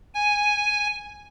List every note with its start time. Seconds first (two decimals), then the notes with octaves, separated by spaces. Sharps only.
0.14 G#5